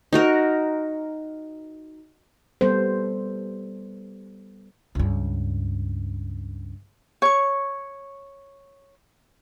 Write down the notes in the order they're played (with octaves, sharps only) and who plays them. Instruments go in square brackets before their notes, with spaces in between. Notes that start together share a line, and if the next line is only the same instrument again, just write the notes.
[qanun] D#4 F#4 A#4
[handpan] G3 B3 A4 C5
[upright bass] C#2 G2
[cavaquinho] C#5 C#6